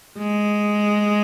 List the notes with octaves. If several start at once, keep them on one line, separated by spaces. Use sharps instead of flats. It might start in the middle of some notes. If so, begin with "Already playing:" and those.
G#3